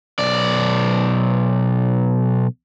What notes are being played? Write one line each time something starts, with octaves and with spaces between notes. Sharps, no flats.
B1 D5